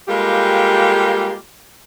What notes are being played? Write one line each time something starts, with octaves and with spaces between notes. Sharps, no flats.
G3 G#3 A#3 F4 G4 A4